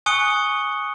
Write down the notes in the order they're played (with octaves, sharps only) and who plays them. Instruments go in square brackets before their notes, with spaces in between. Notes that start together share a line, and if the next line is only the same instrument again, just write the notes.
[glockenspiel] G#5 C#6 D#6 F#6 C#7 G7